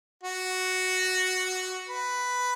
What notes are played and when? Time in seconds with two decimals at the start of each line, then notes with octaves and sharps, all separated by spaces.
0.23 F#4
1.89 B4